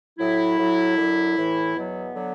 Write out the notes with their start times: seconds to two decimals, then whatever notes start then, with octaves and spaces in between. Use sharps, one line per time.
0.19 A2 F#3 E4
0.58 A2 F#3
0.97 F#2 D3 F#3
1.36 A2 E3
1.76 E2 B2 F#3 B3
2.14 D3 F#3